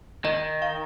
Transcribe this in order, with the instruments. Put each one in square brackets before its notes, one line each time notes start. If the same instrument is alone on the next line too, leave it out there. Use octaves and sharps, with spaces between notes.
[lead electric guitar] D#3 [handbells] D#5
[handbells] F5